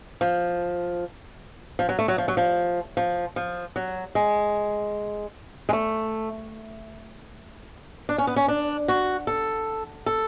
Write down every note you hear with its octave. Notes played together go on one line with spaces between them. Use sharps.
F3
F3
F#3
A3
F#3
F3
F#3
F3
F3
F3
F#3
G#3
G#3
A3
D4
C#4
B3
C#4
D4
F#4
A4
A4